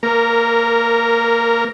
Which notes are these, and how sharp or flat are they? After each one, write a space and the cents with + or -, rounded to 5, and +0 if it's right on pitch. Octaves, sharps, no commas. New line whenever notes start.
A#3 -20 A#4 +0